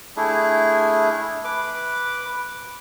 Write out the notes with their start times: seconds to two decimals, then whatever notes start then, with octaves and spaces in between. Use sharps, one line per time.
0.17 A3 D4 E4 G#4
1.44 B4 D6